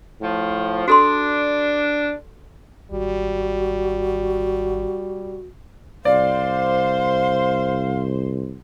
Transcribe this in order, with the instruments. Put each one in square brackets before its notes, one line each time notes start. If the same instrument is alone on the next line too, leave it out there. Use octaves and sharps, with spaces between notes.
[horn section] A2 F3
[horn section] D4 [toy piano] F#4 A4 C6
[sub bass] G#1 [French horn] G3 [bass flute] F#4
[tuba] C2 [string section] C5 [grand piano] D5 [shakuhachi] F5